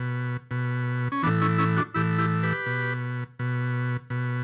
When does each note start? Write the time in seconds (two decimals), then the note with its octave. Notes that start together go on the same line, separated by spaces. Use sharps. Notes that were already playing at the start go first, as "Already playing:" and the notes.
Already playing: B2
0.51 B2
1.12 C#4
1.23 E3 B3 D4
1.27 A2
1.41 C#4 E4
1.58 C#4 E4
1.76 D4 F#4
1.94 A2 E3 E4 G4
2.18 E4 G4
2.43 G4 B4
2.66 B2
3.39 B2
4.10 B2